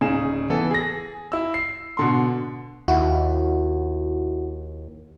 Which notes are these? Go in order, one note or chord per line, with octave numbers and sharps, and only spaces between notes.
D1 C#3 D#4 G#4 E7
E3 B3 A4
G#4 A#6
E4 E6
C7
B2 D3 C6
D#2 E4 F#4